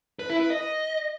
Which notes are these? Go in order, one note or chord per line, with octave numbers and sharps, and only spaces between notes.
B4
E4
B4
D#5